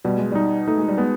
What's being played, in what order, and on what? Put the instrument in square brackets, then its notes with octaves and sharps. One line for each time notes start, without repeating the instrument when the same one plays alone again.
[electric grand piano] B2 [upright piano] G3
[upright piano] G#3
[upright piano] G3 [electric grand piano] D#4
[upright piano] A3 [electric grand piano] D#4
[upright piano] G#3
G3
[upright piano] G#3 [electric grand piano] B3